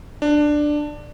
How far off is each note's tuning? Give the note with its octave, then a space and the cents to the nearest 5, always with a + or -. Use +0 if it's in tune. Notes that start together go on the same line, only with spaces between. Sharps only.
D4 +10